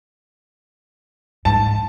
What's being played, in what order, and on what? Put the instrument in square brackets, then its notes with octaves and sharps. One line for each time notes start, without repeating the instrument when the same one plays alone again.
[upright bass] G#2 [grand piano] A5